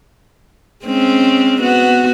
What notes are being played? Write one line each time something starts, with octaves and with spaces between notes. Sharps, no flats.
G#3 C4 C#4
B3 F#4